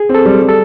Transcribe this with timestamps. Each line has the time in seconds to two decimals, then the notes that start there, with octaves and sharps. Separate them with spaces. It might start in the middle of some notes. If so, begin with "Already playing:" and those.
Already playing: G#4
0.09 C4
0.15 A4
0.25 G3
0.41 G3
0.49 A4